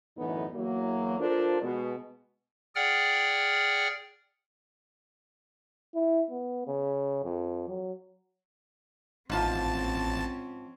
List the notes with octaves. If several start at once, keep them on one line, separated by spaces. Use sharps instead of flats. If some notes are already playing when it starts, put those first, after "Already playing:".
F#2 A2 D3 E3 B3 D#4
E2 F#3 A#3
F3 D4 F4 A4 A#4 C5
B2 G#3 B3
G#4 D5 F#5 G5 F6
E4
B3
C#3
F2
F#3
A1 G#2 F3 C4 C#4 A5